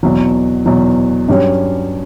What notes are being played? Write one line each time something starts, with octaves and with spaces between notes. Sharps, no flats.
E2 B2 F#3
E2 B2 F#3
G2 F#3 C#4 G4 C#5